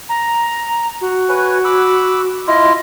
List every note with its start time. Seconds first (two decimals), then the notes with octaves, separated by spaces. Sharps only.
0.09 A#5
1.01 F#4
1.29 B4 C#5 G#5
1.65 B5 D6 E6
2.47 E4 F4 D#5